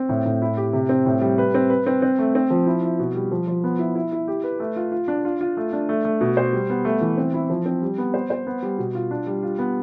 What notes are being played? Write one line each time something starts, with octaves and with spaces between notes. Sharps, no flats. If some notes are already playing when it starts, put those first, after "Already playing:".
Already playing: C4
A2
A2
E4
G4
C3
C4
A2
G3
B4
C4
B4
C4
C4
A3
C4
F3
E4
E4
B2
G3
F3
F3
B3
E4
E4
E4
G4
B4
A3
F4
F4
D4
F4
F4
A3
D4
A3
A3
B2
C5
G3
B3
A3
E3
C4
E4
F3
C4
G3
B3
C5
C5
B3
G3
B2
F4
D4
G3
F4
B3